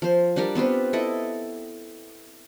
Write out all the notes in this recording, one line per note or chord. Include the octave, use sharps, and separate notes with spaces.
F3 C5
G3 D4 G4 A#4
B3 C4 F4 B4
E4 A4 D#5